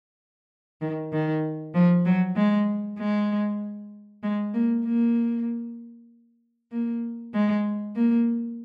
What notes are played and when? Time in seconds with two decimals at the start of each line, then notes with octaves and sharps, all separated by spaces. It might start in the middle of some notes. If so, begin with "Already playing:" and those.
0.81 D#3
1.12 D#3
1.75 F3
2.05 F#3
2.36 G#3
2.99 G#3
4.23 G#3
4.54 A#3
4.85 A#3
6.72 A#3
7.34 G#3
7.96 A#3